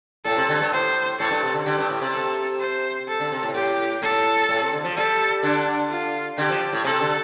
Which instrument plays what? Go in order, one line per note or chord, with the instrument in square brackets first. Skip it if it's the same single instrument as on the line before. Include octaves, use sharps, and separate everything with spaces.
[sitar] A2 [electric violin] A4
[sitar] C3
D3
G2
[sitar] A2 [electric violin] C5
[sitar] A2 [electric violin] A4
[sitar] G2
C3
D3
[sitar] D3 [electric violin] G4
[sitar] G2
A2
C3
[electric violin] A4
C5
A4
[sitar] D3
C3
A2
[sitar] A2 [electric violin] G4
[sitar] A2 [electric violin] A4
[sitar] A2
C3
D3
F3
[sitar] G3 [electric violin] A4
[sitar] D3 [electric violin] D4
[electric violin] F4
[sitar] D3 [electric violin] G4
[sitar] F3
A2
[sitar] C3 [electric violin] A4
[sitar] D3